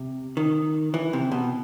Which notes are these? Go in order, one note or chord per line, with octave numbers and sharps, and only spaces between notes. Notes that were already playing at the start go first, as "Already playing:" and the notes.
Already playing: C3
D#3
E3
C3
B2